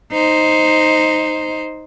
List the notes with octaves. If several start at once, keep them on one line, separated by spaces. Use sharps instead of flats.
D#4 C5